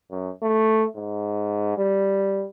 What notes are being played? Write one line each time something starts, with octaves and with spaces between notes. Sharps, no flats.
F#2
A3
G#2
G3